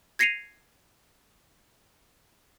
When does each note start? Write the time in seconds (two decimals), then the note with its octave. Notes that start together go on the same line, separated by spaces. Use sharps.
0.19 G#6 A#6 C7 C#7 D#7 F7